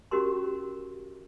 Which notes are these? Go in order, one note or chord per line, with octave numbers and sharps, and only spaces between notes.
C#4 F#4 G4 A#4 C6